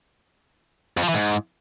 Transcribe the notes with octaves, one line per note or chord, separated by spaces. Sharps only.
F2
F3
E3
G#2